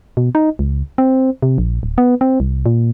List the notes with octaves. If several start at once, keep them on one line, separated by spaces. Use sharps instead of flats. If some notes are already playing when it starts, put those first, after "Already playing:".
B2
D#4
C#2
C4
C3
A#1
D1
B3
C4
C2
A#2